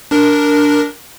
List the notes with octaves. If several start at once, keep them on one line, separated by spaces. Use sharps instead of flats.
D4 A#4